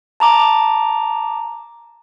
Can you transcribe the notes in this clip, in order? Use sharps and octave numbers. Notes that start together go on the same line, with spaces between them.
A5 A#5 D6